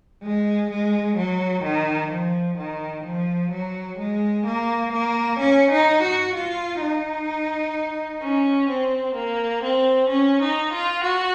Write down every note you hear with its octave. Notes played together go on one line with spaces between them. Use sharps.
G#3
G#3
F#3
D#3
F3
D#3
F3
F#3
G#3
A#3
A#3
C#4
D#4
F#4
F4
D#4
C#4
C4
A#3
C4
C#4
D#4
F4
F#4